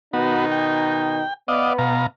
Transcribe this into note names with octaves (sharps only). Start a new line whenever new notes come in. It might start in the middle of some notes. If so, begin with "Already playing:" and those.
B2 D#3 B3 D#4 F#4
G5
B3 D5 D#5 F5
B2 F5 A#5